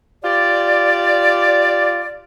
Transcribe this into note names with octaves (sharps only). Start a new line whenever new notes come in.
F4 G4 D5